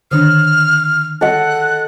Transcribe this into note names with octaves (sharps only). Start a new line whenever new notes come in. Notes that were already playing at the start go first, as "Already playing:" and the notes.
D3 D#3 D4 F6
A4 D#5 F#5 F#6